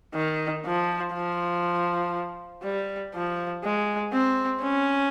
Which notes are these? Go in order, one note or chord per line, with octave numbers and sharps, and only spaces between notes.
D#3
F3
F3
G3
F3
G#3
C4
C#4